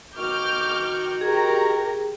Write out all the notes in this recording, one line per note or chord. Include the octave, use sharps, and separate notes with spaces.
D#3 F#4 D6 F6 G6
G4 G#4 A#4 A#5